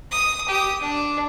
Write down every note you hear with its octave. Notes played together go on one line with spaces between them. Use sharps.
D#6
G4 D#6
D4